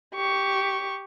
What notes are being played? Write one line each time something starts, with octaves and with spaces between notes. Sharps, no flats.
G4 C#6